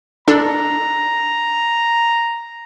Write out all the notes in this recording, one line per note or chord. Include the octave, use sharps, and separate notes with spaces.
D4 A4 D5 A#5